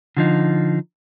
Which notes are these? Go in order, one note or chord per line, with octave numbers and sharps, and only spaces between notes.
D3 F3 D#4